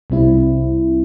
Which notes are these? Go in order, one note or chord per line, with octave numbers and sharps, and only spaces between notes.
C2 C3 G3 C4 E4